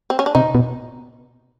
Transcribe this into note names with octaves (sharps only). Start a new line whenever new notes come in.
C4
C#4
D4
C3 D#4
B2